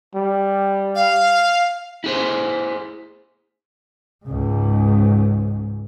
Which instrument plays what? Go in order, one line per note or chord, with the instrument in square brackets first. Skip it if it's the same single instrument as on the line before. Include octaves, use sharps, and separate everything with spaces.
[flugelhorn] G3
[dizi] F5
[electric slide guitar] E4 G#4 C5
[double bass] C#2 G#2